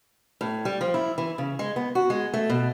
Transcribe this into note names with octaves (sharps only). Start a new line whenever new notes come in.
A2
G3
F3
E4
E3
C#3
G#3
B3
F#4
G#3
A3
B2